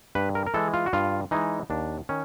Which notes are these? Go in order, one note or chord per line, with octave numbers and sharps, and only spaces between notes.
G2 B4
A#4
A#4
E3 G#3 A4
F4
F#4
G2 F4
E3 G#3 D#4
D#2 D4
D#3 C#4